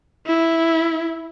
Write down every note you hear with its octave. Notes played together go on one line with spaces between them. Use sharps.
E4